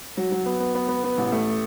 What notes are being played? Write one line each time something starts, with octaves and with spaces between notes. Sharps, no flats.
F#3
F#3
B3
B3
B3
B3
B3
A1
A3